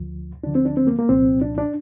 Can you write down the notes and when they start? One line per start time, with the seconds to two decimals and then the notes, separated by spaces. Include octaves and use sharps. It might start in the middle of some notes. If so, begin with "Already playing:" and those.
Already playing: D2 D3 F3
0.44 D2 D3 F3 D4
0.55 C4
0.65 D4
0.77 C4
0.87 A#3
0.99 A#3
1.09 C2 A#2 F3 C4
1.41 D4
1.58 D4